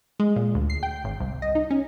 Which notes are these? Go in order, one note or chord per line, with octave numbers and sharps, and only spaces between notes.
G#3
A#2
D2
C7
G5
G#1
C2
D#5
D#4
C#4